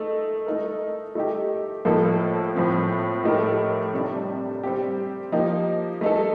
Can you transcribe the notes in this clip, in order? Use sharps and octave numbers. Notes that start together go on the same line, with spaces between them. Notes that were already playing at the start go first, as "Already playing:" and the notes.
Already playing: A3 D#4
A3 D#4 A#4
A3 D#4 G4
A2 F3 A#3 D#4 A4
A2 F3 C4
A2 A3 D#4 G4 A#4
C3 G3 D4
G3 C4 G4
F3 A#3 D#4 G4
A3 D#4 A4